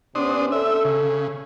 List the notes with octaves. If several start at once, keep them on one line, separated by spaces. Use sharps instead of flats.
C3 B3 C#4 D4 C5 D#6
A4 E5
C#3